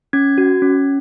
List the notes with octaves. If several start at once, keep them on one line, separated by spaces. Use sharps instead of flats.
C#4 G#6
F#4
C#4